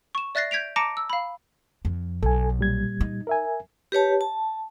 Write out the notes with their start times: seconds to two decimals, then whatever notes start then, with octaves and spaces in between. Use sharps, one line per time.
0.15 C#6 E7
0.35 D5 E5 F#6 A6 A#6 C7
0.51 G6 G#6 B6 D7 F7
0.76 A5 A#5 D6 A#6 C#7 D7
0.97 E6
1.10 F5 B5
1.85 F2
2.23 B1 A4 G#5
2.59 A#2 G3 G#6
3.01 D#4
3.27 A#4 E5 G#5
3.92 G4 B4 C#5 A5
4.21 A5